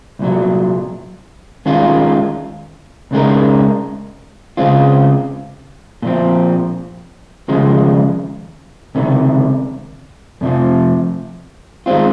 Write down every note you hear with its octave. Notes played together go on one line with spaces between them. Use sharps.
C2 A#2 F#3
D#2 D#3 G#3 C#4 F4
C#2 C#3 G#3 D#4 A#4
C#2 C#3 G#3 C4 F4
A#2 F3 C4
D#2 C#3 F3 G#3
C#2 C3 D#3
F2 C3 F3
D#3 G#3 C4 F4